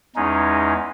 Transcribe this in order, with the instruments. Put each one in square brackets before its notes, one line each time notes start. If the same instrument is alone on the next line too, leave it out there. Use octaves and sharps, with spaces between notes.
[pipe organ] E2 G#3 C#4 D#4